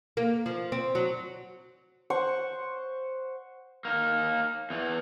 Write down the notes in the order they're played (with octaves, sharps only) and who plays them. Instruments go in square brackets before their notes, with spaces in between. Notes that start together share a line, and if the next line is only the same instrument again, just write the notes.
[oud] A#3
F3
C4
F#3
[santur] C5 F#5 C#6
[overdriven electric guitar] A#3 D#4
E2 E3